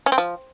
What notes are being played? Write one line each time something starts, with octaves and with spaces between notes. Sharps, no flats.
C#4
C4
F3